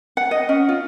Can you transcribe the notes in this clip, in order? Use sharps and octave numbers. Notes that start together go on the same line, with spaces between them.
F#5
D#5
C#4
F4